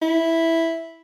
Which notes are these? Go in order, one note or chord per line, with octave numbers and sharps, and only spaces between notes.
E4